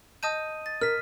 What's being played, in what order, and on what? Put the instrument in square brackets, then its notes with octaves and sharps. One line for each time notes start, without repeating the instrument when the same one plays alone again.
[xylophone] D#5 A5 G6 [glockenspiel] D#6 D#7
[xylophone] A6
[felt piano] A#4 [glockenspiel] F6 B6